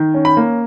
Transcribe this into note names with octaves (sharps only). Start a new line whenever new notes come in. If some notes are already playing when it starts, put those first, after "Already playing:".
Already playing: D#3
C#4
B5
A#3